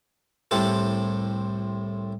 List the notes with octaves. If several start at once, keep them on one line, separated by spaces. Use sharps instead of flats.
C2 A2 C4 G4 A4